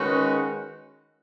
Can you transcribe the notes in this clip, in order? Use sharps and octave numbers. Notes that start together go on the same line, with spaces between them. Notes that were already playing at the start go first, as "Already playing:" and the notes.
Already playing: D#3 G#3 C#4 F#4 B4